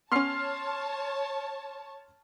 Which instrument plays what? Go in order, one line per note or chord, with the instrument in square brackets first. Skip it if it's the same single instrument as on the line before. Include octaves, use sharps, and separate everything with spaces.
[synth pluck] B3 C#4 [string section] C#5 A5 [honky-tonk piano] C6 F6 C7